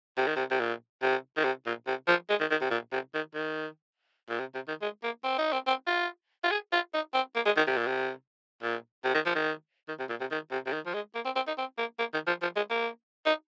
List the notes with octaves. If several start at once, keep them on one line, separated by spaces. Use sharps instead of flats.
C3
D#3
C3
C3
A#2
C3
D#3
C3
A#2
C3
F3
G#3
D#3
D#3
C3
A#2
C3
D#3
D#3
A#2
C3
C3
D#3
G#3
A#3
C4
D#4
C4
C4
F4
F4
G#4
F4
D#4
C4
A#3
G#3
D#3
C3
A#2
C3
A#2
C3
D#3
F3
D#3
D#3
C3
A#2
C3
D#3
C3
C3
D#3
F3
G#3
A#3
C4
C4
D#4
C4
A#3
A#3
D#3
F3
F3
G#3
A#3
D#4